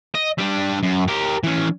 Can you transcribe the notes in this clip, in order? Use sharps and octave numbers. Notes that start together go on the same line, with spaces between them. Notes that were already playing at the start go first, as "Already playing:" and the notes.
D#5
G3 D4
F#2
G4 A#4
E3 C#4